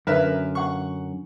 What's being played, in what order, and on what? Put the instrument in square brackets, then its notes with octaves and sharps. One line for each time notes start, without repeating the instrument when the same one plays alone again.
[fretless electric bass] F#2 D3 [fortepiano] A#4 B4 E5
[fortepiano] F#5 C#6